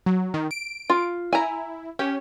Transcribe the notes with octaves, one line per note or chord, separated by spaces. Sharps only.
F#3
D#3
D7
F4
E4 G#5 A#5
C#4 G4